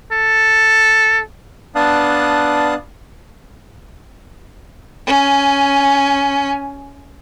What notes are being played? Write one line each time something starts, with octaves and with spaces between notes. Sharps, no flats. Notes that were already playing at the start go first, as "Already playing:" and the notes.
A4
B3 D4 F5 A5 D#6 F#6
C#4 G#5